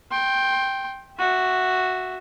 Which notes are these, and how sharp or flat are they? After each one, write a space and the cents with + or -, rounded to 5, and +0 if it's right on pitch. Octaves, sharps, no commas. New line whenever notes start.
G5 +0 C6 +25
F#4 +0 E5 +0